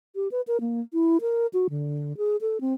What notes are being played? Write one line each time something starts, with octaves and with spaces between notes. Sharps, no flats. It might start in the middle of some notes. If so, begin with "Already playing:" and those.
G4
B4
A#4
A#3
E4
A#4
F#4
D3
G#4
A4
C4